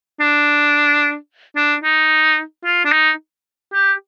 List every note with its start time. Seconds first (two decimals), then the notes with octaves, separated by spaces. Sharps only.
0.20 D4
1.56 D4
1.84 D#4
2.65 F4
2.85 D4
2.92 D#4
3.73 G4